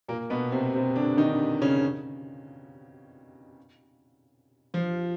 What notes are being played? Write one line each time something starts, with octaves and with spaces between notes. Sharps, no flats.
A#2 A#3
B2 B3
C3 C4
C3 C4
D3 D4
D#3 D#4
C#3 C#4
F3 F4